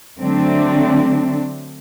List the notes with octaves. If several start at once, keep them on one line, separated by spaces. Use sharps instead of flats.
D3 F#3 A3 C4 D4